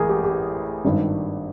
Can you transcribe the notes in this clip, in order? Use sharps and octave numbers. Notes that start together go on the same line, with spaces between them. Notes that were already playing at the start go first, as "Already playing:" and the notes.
Already playing: A1 A2 E3 G#4 A#4
G4
G4
G#1 G2 D#3